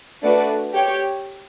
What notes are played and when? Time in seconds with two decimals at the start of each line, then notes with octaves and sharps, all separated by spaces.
0.23 A3 D4 F#4 B4 D5
0.73 G4 C#5 G5